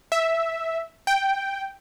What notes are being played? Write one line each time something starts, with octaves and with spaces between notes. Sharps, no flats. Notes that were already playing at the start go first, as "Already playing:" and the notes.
E5
G5